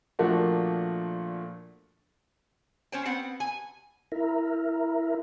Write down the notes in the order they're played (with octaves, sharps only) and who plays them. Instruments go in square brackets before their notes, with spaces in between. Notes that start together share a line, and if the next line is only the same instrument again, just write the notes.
[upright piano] A#2 F3 A3 A#3 D4 F#4
[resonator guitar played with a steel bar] C#4 C5 G5
B3 C4 F#5
G#5
[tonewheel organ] E4 A#4